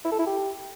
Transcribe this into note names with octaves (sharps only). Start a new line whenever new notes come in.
E4
A4
E4
G4